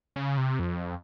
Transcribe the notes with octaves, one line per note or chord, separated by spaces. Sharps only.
C#3
C3
F2